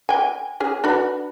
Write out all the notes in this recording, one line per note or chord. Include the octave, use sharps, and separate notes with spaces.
G5 G#5
C#4 G#4
D4 F#4 B4